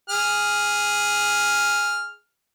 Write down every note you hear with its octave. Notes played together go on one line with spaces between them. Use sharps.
G#4 F6